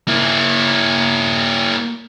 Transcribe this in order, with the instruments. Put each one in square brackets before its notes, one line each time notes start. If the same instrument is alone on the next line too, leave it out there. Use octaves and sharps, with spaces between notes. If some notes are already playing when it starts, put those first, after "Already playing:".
[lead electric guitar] A#3 E4